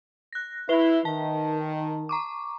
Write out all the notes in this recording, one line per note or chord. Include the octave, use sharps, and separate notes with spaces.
F#6 A#6
E4 B4 E5 G7
D#3 A5
A#5 C#6 D6